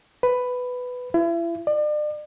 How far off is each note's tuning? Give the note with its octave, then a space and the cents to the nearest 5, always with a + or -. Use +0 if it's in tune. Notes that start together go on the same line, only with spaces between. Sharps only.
B4 +10
E4 +35
D5 +35